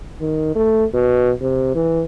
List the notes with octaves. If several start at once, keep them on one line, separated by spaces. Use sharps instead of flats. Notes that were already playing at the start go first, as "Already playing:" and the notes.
D#3
A3
B2
C3
E3